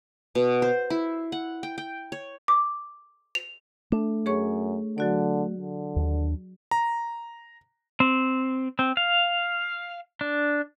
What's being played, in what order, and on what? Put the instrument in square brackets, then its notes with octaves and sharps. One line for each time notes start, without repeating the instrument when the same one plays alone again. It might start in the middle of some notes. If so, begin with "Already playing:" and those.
[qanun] B2
C5
E4
F#5
G5
G5
C#5
[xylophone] D6
F7
[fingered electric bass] A3 [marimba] D4
[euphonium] F#2 [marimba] G#4 C#5 C#6
[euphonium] D3 [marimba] F#3 F#4 D5
[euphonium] D3
[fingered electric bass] D#2 D4
[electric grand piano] A#5
[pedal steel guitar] C4
C4
F5
D4